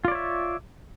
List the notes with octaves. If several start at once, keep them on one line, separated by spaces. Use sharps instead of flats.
F4 C#5 D5 E5